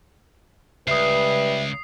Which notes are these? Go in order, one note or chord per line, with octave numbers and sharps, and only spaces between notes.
C#2 G3 B4 E5 D#6 C7